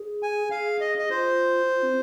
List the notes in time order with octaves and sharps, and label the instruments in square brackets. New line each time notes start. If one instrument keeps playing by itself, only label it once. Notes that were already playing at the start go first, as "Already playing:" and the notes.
Already playing: [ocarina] G#4
[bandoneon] G#5
[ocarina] G#4 [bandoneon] F5
[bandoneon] D#5
D#5
[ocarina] F4 [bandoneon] C5
[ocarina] F4
C4